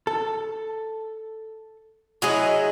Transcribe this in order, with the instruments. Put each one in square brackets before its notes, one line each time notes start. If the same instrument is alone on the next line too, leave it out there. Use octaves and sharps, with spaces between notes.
[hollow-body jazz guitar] A4
[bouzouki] F#3 G#3 E4 [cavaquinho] F#4 G#4 D#5